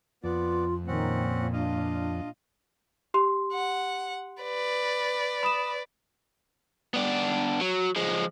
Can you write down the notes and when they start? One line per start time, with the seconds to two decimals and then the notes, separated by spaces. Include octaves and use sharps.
0.24 F2 B3 F4 D5
0.87 A#2 D#3 C4 C#4 F#5
1.53 D4 F4 D#5 F5
3.14 G4 C6
3.53 F#5
4.42 B4 D5
5.43 B5 D#6 E7
6.94 B3 D4
7.61 F#3
7.96 F3 G#3